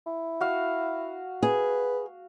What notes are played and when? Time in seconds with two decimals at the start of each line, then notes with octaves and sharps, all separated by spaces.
0.07 E4
0.41 F#4 F5
1.43 G#4 B4